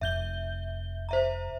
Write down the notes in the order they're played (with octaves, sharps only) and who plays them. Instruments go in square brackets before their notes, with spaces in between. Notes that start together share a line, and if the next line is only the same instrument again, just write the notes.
[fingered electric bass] F1 [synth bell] E5 G6 G7
[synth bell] C5 E5 A#5